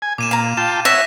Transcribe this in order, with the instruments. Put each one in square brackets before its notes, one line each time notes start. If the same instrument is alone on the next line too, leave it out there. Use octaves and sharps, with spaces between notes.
[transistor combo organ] G#5
[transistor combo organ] A#2 [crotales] D6 D#7 E7
[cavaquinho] F5 A#5
[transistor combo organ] F4 G5 A5 [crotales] E7
[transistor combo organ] C#5 F#5 [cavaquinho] E5 [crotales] A#6 B6 E7